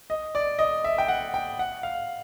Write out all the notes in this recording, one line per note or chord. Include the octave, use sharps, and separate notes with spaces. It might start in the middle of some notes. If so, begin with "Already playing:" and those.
D#5
D5
D#5
E5
G5
F#5
G5
F#5
F5